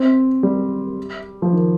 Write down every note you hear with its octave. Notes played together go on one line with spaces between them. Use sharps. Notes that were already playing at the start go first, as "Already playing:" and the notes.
Already playing: C4
G3
F3
D#3